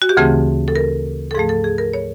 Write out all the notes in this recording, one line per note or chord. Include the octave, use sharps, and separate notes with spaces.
F#4
G4
D2 C#3 E3 A3 C4 G#4
A4
A#4
A4
G#2 F3 A3 G#4
A4
G#4
A#4
C#5